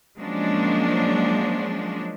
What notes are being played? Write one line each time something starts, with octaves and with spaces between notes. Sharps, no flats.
F3 F#3 G#3 A#3 C#4 D4